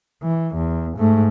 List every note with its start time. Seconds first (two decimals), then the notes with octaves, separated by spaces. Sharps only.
0.23 E3
0.55 E2
0.97 G#2 A3